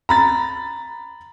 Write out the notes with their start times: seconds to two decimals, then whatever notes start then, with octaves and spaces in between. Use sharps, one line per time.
0.09 A#5 B5 A6